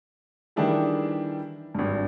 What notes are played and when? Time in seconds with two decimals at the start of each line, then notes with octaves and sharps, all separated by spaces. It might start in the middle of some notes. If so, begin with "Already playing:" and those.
0.56 D#3 E3 G3 D4 E4 G#4
1.75 G#1 G2